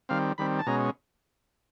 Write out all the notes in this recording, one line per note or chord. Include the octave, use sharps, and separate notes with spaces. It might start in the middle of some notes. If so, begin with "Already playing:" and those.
D#3 G3 C4 F5
D#3 G3 C4 B5
A5
B2 G#3 C#4 A#5